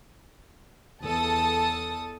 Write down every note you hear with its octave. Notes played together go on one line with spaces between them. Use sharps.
E2 A4 A5 D#6